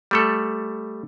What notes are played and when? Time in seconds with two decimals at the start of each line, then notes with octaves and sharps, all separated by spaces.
0.11 G3 A3 A4